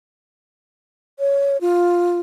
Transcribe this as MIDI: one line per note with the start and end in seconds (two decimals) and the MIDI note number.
1.19 1.57 73
1.61 2.21 65